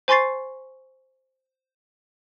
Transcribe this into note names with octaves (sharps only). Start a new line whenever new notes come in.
C5 G#5 C6 C#6 A6 C7